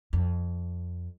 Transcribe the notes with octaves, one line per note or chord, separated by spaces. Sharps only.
F2